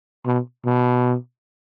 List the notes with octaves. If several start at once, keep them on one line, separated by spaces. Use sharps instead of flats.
B2
B2